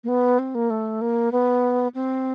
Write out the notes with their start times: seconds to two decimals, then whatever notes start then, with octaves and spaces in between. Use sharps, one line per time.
0.04 A#3
0.08 B3
0.39 C4
0.55 A#3
0.70 A3
1.01 A#3
1.32 B3
1.95 C4